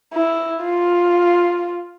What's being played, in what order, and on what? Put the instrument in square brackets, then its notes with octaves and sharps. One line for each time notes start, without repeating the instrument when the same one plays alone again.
[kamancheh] E4
F4